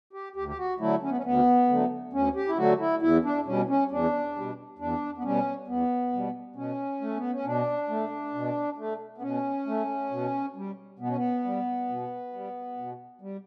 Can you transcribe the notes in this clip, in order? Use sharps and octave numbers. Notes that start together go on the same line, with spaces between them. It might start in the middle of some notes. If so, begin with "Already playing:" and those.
G4
D2 G4
G4
F#4
D3 F#3 A3 E4
C#4
B3
C#4
D2 B3
D3 F#3 A3
D2 C#4
G4
E4
D3 F#3 A3 F#4
E4
E2 E4
D4
B2 G3 C#4
C#4
E2 D4
B2 G3
E2 D4
B3
B2 G3 C#4
E2 B3
B2 G3
B2 C#4
A3
B3
C#4
B2 D4
A3
B2
A3
B3
B2 C#4
A3
B2
G3
B2 B3
C#4
B3
G3
B2
G3
B2
G3